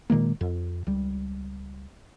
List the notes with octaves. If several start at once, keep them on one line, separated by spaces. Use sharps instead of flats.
A#2 D#3 G#3 A#3
F2
C#2 G3